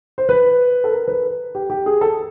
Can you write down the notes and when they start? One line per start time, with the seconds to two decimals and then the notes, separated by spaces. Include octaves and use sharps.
0.18 C5
0.29 B4
0.84 A4
0.92 A#4
1.08 B4
1.55 G4
1.70 G4
1.86 G#4
2.01 A4